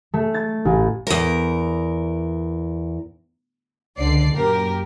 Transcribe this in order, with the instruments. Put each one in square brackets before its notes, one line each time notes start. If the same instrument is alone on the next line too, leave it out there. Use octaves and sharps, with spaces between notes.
[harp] A3
A6
A1
[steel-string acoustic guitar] E2 A#4
[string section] C#2 D3 D5 C7
F#2 A#2 G4 A#4